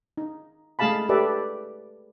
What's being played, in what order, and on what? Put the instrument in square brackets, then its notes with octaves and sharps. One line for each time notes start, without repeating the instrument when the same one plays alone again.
[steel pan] D#4
G#3 A3 G#4 F5 A5 B5
G4 A4 B4 D5 E5